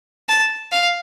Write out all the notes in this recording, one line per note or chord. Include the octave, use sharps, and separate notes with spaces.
A5
F5